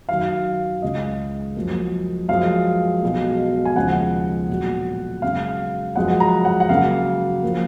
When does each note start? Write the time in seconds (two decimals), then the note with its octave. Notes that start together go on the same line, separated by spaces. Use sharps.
0.09 F#2 D#3 F#3 F5
0.82 C#2 C#3 G#3 D#5
1.56 F#2 F3 A#3
2.29 F#2 F3 G#3 F5
3.02 B1 B2 G#3
3.65 G#5
3.76 D#2 C#3 F3 G#3 F#5
4.50 B1 A#2 F#3
5.22 F#2 C#3 G#3 F5
5.96 F#2 F3 G#3 F#5
6.20 A#5
6.45 F#5
6.60 F#5
6.69 F#2 C#3 F#3 A#3 F5
7.43 F3 A#3